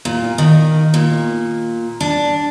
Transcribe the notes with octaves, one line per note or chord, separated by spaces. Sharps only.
A#2
D#3
A#2
D4